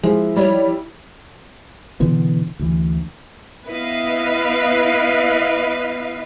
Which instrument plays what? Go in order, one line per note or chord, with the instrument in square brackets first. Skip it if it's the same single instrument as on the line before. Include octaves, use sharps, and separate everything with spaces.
[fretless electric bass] F3 [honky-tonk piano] G#3 [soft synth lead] E4
[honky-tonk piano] G3 [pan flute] C#5
[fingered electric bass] B2 D3 E3 B3
D2 E3
[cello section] B3 E4 B4 D#5 F5